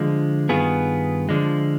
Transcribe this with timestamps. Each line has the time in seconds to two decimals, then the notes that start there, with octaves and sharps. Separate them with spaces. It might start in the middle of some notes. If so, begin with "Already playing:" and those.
Already playing: D3 F3 G#3
0.49 G2 D#3 B3 F4 G#4
1.29 D3 F3 G#3